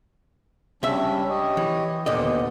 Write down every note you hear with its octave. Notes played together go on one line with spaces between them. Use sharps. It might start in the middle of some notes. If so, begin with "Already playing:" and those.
C#2 G3 C#4 D4 E5
G4 C#5 D#5
E3
D#2 A#2 D3 B3 D#5